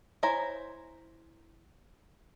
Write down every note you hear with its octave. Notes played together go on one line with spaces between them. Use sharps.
E4 C5 C#5 G#5 A#5